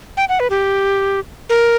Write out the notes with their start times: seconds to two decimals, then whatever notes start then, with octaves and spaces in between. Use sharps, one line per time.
0.17 G5
0.29 F#5
0.40 B4
0.50 G4
1.49 A#4